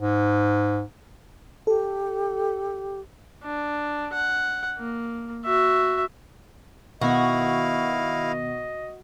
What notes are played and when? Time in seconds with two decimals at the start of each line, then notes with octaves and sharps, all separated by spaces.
0.01 G#2
1.67 G4 A4
3.43 D4
4.13 F#5
4.78 A#3
5.45 F#4 E5
7.01 B2 D#3 B3 E4 F#4 D#5 F5